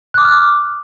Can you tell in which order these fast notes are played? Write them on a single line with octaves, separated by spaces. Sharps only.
F#6 D6 D#6 F6